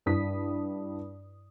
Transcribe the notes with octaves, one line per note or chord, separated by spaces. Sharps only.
G2 E4 D#6 B6